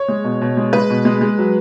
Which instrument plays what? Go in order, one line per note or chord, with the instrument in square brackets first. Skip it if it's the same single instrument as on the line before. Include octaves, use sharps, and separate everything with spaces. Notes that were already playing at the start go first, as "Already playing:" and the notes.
Already playing: [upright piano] C#5
G#3
B2
B2
G#3
G#3 B4
B2
G#3
G#3
F#3